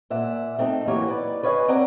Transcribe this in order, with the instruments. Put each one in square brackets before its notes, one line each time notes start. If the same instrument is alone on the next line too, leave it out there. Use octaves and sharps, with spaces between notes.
[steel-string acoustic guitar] A#2 E5 F#5
A3 C4 D#4
E3 F#3 A#3 G4 A#4 C#5
B4 D5
B4 C#5 D#5 F5 F#5 G#5
C4 F#4 D5 F#5 A#5